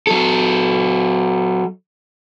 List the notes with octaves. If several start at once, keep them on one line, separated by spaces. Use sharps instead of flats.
F#3 A4